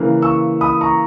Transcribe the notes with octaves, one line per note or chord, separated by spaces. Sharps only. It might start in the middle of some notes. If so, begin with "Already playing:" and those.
Already playing: C#3 E3 A#3
C#6 E6
B5 D#6
A#5 C#6